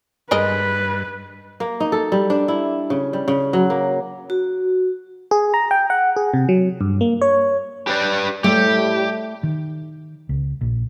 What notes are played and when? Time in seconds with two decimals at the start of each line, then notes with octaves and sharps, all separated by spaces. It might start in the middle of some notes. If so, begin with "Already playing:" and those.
0.31 G2 G#3 A#4 B4 D#5
1.60 A#3
1.80 D#4
1.92 A4
2.12 G3
2.30 D4
2.48 E4
2.90 C#3
3.13 G3
3.28 C#3
3.53 F#3
3.70 A#3
4.30 F#4
5.31 G#4
5.54 A#5
5.71 G5
5.90 F#5
6.16 G#4
6.34 C3
6.49 F#3
6.81 G2
7.01 A#3
7.22 C#5
7.87 G4 B4 D5
8.44 A2 G3 A3 G4
9.43 D#3
10.29 C#2
10.61 A#1